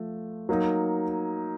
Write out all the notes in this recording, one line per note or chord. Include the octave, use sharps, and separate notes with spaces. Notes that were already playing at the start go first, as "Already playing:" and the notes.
Already playing: F3 A3
F#3 A#3 D#4